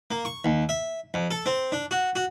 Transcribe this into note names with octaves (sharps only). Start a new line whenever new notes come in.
A#3
C#6
D#2
E5
F2
A4
C4
D4
F#4
F#4